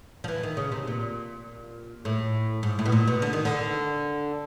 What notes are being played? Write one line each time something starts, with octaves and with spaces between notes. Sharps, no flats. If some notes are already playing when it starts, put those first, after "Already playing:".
F3
E3
D#3
C#3
C3
A#2
A2
G#2
A2
B2
A#2
B2
D3
D#3
D3